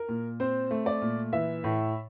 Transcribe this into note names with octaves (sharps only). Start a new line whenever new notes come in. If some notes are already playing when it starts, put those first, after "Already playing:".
Already playing: A#4
A#2
C4 C5
A3
D5
A#2
E3 E5
A2